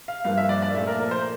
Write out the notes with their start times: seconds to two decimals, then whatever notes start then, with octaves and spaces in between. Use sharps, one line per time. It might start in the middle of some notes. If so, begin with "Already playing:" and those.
0.08 F5
0.24 G2 F3 A#3 F5
0.37 E5
0.49 D5
0.62 D5
0.74 A#2 F3 A3 E5
0.87 A#4
0.99 A#4
1.11 C5